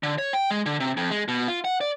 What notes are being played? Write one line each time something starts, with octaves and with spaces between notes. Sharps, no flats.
D3
C#5
G5
G#3
D3
C3
F2
G#3
B2
F4
F#5
D5